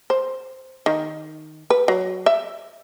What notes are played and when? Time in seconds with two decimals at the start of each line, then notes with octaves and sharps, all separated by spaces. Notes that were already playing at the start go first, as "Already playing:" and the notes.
0.10 C5
0.86 D#3
1.70 B4
1.88 F#3
2.26 E5